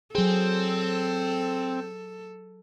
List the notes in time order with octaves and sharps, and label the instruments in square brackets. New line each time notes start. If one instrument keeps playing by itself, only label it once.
[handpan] F#3 G#4 [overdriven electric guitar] C4 [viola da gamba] A4